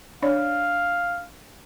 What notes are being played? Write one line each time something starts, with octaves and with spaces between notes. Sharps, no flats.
D4 C#5 D5 F5